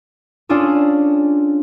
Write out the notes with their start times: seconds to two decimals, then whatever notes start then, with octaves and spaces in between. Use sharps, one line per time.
0.49 C#4 D4 F4 G#4 A4